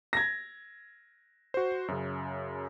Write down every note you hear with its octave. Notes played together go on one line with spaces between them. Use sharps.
G#6 A#6
F#4 C5
F#2 C#3